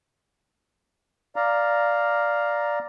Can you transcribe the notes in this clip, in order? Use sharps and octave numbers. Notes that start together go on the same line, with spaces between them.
D5 F5 A#5